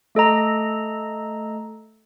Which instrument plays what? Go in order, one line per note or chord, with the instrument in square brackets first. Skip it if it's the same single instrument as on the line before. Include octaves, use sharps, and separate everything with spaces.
[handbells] A3 A4 D#5 A#5